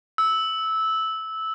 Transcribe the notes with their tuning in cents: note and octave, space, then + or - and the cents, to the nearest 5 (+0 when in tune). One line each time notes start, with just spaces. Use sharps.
E6 -15